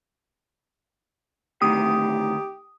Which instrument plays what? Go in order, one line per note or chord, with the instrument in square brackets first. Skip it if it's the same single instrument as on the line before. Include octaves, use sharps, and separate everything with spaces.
[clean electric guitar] D2 A2 D#3 [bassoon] G4 [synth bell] D#6